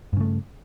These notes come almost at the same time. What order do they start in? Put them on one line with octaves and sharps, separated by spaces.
G2 C#3 A3